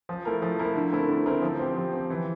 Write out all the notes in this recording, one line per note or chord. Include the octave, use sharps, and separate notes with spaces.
F3
A3 E4 A#4
F3
A3 E4 A#4
D3
A3 C4 E4 A#4
D3
A3 C4 E4 A#4
F3
C4 G4
F3
C4 G4
E3